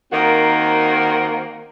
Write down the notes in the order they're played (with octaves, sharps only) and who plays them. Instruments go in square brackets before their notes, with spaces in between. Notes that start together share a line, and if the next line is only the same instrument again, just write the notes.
[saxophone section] D#3 A#3 C4 F#4 A#4